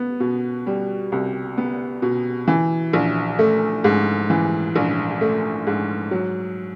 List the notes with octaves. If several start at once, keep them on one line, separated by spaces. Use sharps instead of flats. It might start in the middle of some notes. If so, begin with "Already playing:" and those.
Already playing: B3
B2
G3
C2
B3
B2
E3
A#1
A3
G#2
E3
A#1
A3
G#2
F#3